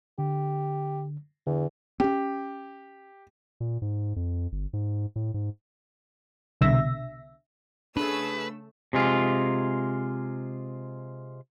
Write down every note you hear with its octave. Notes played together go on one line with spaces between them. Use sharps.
D3 G4
E2 D3
C4 C#4 G4
A#2
G#2
F2
G1
G#2
A2
G#2
C2 B2 D3 E5 A#6
C#3 A3 D4 G#4 B4 E6
C3 G#3 F4